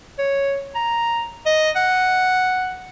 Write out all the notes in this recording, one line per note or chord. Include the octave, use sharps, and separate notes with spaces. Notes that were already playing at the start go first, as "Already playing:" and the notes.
C#5
A#5
D#5
F#5